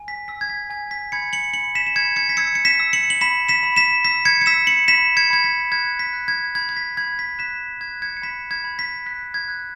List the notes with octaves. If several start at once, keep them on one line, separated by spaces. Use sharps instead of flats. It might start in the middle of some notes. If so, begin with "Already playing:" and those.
Already playing: G#5
B6
E6 B6
G#6
B6
G#5 G#6
B6
B5 G#6 C#7
C#7 F#7
B5 C#7 F#7
B6 E7
E7
B5 G#6 C#7
G#6 C#7
B6
E6 G#6 C#7
C#7
B6 E7
E6
C#7 F#7
F#7
B5 B6 E7
B6 E7
B5
B6 E7
E6 B6
G#6 C#7
C#7
E6 B6 E7
C#7 F#7
B5 B6 E7
G#6 C#7
B5 G#6
B6
F#6 G#6
B6
F#6
G#6
B5 G#6
G#6
B6
B5 G#6
B6
F#6 B6 E7
F#6 G#6
G#6 C#7
C#7
B5 B6 E7
G#6
B5
B6
F#6 B6
G#6
F#6